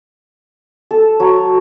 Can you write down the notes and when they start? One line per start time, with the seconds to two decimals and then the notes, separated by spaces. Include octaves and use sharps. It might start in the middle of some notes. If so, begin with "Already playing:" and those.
0.91 A4
1.20 F#3